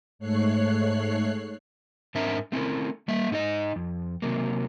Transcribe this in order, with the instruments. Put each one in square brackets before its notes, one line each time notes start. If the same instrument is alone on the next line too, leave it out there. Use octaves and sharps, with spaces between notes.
[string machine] G#2 A3 C#5 F#6 C7
[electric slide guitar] G#2 C4 D4 A#4 E5 A#5
A3 C4 C#4 E4 A#4
G3 A#3 E5
G#2 D#4 G#4 D#5
F2
C3 F#3 A#3